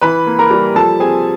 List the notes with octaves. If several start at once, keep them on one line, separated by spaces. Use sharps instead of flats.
E3 B4 B5
A#3
A#4 A#5
G3
F3 A4 A5
C4 G#4 G#5